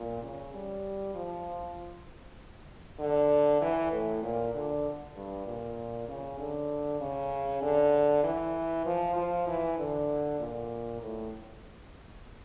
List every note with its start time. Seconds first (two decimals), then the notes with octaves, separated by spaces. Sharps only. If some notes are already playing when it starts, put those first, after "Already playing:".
Already playing: A#2
0.22 C#3
0.53 G3
1.15 F3
3.00 D3
3.61 E3
3.92 A2
4.23 A#2
4.54 D3
5.16 G2
5.46 A#2
6.08 C#3
6.39 D3
7.00 C#3
7.62 D3
8.23 E3
8.86 F3
9.16 F3
9.47 E3
9.78 D3
10.40 A#2
11.01 A2